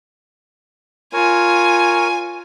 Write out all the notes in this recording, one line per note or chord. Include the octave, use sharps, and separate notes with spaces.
F4 A#4 C#5 G#5